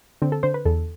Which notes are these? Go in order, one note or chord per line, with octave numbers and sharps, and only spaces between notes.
D3 C4
A4
D3 C5
B4
E2 A4